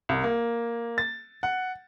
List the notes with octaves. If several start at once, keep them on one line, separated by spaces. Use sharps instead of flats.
C2
A#3
A6
F#5